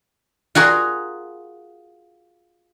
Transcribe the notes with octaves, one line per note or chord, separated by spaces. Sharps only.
F4 F#4 G#4 A#4